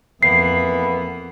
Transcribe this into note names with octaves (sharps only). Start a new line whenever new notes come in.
F2 E3 A#3 B3 C7